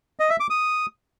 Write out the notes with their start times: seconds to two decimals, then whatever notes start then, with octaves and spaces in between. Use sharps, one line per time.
0.20 D#5
0.30 E5
0.40 D6
0.50 D#6